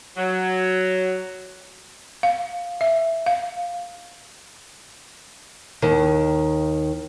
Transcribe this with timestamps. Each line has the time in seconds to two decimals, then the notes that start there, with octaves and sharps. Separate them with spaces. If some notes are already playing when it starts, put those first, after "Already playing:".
0.17 F#3
2.23 F5
2.81 E5
3.26 F5
5.82 D#2 D#3